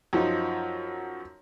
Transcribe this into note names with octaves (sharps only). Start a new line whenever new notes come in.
F#2 F3 D#4